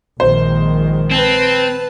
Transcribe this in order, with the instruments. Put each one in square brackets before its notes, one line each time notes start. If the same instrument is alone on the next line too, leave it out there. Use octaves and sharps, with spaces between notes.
[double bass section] A#1 D#3 G#3 [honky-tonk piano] C5
[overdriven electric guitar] C4 [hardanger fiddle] B4 A5